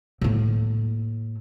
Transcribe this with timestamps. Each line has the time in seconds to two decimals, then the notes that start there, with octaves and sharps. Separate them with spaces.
0.21 A2 A#3